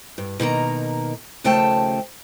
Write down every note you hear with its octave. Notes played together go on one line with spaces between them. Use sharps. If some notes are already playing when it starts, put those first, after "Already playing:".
G2
B2 D#3 A#3 A#5
D#2 C#3 F3 A3 G5 A5